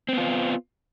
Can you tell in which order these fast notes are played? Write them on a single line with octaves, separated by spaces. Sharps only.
C4 B3 F4